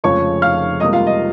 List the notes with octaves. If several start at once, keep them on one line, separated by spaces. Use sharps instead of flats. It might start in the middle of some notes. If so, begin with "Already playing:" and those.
F1 F2 C#3 F3 G#3 C#5 C#6
F5 F6
C#2 C3 G3 A#3 D#5 D#6
F4 F5
D#5